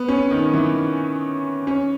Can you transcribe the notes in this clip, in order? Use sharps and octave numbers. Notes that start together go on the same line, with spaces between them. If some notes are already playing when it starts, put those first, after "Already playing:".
Already playing: B3
C#4
D#3
E3
C#4